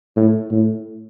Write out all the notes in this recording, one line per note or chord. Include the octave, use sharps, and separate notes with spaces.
A2
A2